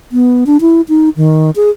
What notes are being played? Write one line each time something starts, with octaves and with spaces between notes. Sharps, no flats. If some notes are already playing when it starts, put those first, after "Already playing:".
B3
D4
E4
D#4
D#3
G#4